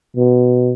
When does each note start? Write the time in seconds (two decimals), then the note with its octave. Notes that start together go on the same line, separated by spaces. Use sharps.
0.17 B2